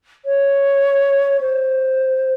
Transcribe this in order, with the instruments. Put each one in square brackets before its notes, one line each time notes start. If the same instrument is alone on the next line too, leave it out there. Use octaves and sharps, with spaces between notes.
[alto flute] C#5
C5